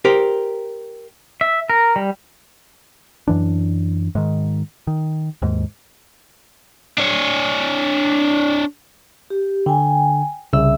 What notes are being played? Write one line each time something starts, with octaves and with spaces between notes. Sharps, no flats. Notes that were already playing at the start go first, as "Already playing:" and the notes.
G4 A#4 C5
E5
A#4
G3
F#2 E3 D4
G#2 D#3
D#3
D#2 G#2
D4 C#5
G4
D3 G5 G#5
C2 C#3 E5 E6